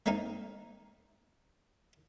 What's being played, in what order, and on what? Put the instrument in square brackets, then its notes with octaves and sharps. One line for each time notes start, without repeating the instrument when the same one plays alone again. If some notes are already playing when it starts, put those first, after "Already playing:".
[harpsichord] A3 A#3 C4 D#4 A#4